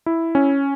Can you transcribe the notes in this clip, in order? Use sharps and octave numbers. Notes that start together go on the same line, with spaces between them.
E4
C#4